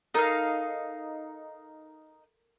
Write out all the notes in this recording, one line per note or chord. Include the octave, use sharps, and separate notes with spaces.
D#4 A4 A#4 F5